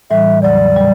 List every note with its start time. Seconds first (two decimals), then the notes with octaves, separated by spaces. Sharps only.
0.10 A2 E3 G3 E5
0.42 E2 C#3 F#3 D5
0.75 A#2 G3